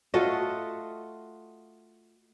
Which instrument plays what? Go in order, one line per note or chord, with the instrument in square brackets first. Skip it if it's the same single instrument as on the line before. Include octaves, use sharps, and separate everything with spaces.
[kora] A3 F4 F#4 D#5